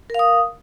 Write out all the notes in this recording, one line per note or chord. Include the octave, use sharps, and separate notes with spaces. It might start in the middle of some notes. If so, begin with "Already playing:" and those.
A#4 F5 D#6